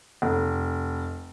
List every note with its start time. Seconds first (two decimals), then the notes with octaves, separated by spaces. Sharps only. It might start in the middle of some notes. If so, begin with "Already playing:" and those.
0.22 F1